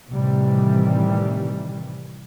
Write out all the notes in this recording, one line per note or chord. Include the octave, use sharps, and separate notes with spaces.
A2 C3 D#3 E3 G3